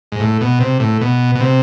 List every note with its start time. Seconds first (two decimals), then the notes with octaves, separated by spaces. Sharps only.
0.12 G#2
0.20 A2
0.41 B2
0.60 C3
0.80 A2
1.01 B2
1.35 B2
1.40 C3